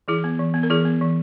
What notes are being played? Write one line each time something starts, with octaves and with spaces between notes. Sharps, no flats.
E3 E4 G#4
B3
E3
B3
A#4
E3 E4 G#4
B3
E3